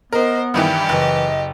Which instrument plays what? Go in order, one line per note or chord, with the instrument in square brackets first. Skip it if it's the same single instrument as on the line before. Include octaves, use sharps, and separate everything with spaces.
[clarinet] B3 [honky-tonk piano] A#4 [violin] C5 [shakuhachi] D#5
[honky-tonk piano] G2 D#3 E3 [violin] G4 [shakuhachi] E5
[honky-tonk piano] F#1 [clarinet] E3 [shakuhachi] D#5